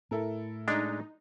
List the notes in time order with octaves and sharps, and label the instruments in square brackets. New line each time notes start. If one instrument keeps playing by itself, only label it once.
[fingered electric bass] A2 [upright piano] E4 A4 A#4
[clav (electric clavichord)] G#3 D4 [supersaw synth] D#4